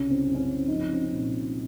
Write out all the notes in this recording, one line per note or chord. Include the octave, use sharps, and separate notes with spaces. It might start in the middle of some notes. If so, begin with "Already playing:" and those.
Already playing: C2 C#3 C#4
C4
F#2
C#4
C4
F3 D#4
C#4
C4
C#4
A#2